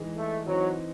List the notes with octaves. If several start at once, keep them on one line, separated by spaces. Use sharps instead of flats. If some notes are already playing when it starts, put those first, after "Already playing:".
Already playing: E3 G#3 D#4 G#4 D#5
A3
E3 F#3 C4 D#4